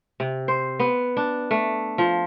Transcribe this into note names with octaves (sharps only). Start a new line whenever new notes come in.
C3
C5
B3
D4
A3
F3